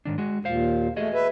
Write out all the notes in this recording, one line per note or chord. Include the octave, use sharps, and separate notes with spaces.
G#2 D#3 D4
G#3 F#4
D#2 A#2 C5 F5
A3 F#4 G#4 D#5
B4 E5